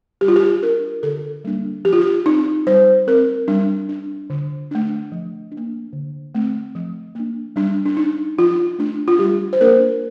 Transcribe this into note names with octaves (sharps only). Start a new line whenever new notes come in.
G3 G4
F4
G4
D4 A#4
D3 A4
G3 A#3 D4
F3 G4
F4
G4
C4 D#4
G3 C5
C4 A#4
G3 D4
D4
D3
A3 D4
F3
D4
A#3
D3
A3 C4
F3
A#3 D4
G3 D4
D4
D4 D#4
F3 F4
A3 D4
F4
G3 G4
C5
A#3 D4 A#4